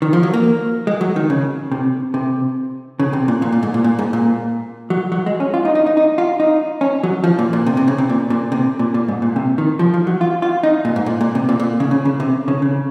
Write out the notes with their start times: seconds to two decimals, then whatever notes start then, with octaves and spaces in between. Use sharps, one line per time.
0.02 D#3
0.13 F3
0.23 F#3
0.34 A#3
0.87 G#3
1.01 F#3
1.16 D#3
1.30 C#3
1.71 C3
2.14 C3
2.99 C#3
3.13 C3
3.28 A#2
3.42 A#2
3.52 A#2
3.63 G#2
3.74 A#2
3.84 A#2
3.99 G#2
4.13 A#2
4.90 F#3
5.12 F#3
5.26 G#3
5.40 C#4
5.54 F4
5.65 D#4
5.75 D#4
5.87 D#4
5.97 D#4
6.18 F4
6.40 D#4
6.81 C#4
7.03 F#3
7.24 F3
7.39 A#2
7.53 A#2
7.66 C3
7.77 C3
7.88 C#3
7.98 C3
8.09 A#2
8.30 A#2
8.52 C3
8.79 A#2
8.94 A#2
9.08 G#2
9.22 A#2
9.36 C3
9.58 D#3
9.79 F3
9.94 F3
10.07 F#3
10.21 F4
10.42 F4
10.63 D#4
10.85 A#2
10.96 G#2
11.06 A#2
11.21 A#2
11.35 C3
11.49 A#2
11.60 A#2
11.80 C#3
11.91 C#3
12.05 C#3
12.20 C3
12.48 C#3
12.62 C#3